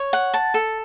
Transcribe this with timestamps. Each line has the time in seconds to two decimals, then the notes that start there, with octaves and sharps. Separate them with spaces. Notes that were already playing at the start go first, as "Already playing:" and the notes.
Already playing: C#5
0.13 F#5
0.34 A5
0.54 A4